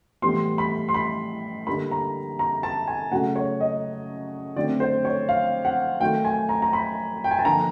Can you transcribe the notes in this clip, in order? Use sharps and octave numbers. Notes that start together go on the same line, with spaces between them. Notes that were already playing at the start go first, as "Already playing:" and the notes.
A2 E3 G3 B3 C6
B5
C6
B5
D3 G3 A#3 B5
A#5
A#5
A5
G#5
C#3 F#3 A3 F#5
C#5
D#5
D3 F#3 A3 C4 D5
C5
C#5
F5
F#5
D#3 F#3 A3 G5
G#5
A#5
A#5
B5
G5
G#5
A5
D3 F3 A#3 A#5